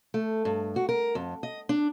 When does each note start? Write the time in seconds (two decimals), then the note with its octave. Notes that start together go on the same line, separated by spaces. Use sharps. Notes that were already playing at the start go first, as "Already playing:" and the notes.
0.14 A3
0.45 G2
0.76 F#4
0.89 A#4
1.15 F2
1.43 D#5
1.69 D4